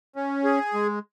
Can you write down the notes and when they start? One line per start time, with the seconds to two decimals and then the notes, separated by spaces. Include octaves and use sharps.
0.16 C#4
0.44 G#4
0.74 G#3